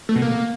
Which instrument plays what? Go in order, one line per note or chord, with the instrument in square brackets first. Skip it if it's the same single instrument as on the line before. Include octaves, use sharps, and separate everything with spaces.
[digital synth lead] A3
B2
A#3